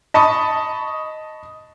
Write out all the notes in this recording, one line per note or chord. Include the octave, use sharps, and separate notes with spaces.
D#5 A5 B5 C#6 D#6